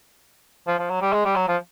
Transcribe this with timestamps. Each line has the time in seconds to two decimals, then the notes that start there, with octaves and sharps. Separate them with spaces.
0.67 F3
0.79 F3
0.89 F#3
1.01 G3
1.13 G#3
1.25 G3
1.36 F#3
1.48 F3